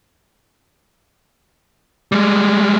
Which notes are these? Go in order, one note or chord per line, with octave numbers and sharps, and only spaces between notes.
G3 G#3